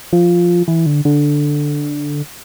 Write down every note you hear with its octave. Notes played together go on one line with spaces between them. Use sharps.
F3
E3
D3
D3